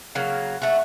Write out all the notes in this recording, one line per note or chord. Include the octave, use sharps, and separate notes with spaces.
C#3 F#3 A#3
A3 F#4